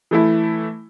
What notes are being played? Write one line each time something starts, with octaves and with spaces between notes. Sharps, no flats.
E3 A3 E4